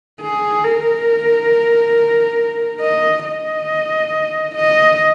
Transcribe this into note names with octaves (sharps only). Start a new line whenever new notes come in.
G#4
A#4
D#5
D#5
D#5